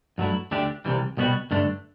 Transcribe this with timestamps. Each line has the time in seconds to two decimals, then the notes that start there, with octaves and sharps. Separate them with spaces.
0.18 G2 F#3 A3 E4
0.51 D2 D3 A3 D4 G4
0.85 C2 C3 E3 G3
1.17 C2 B2 G3 B3 F#4
1.51 G2 D3 A3 D4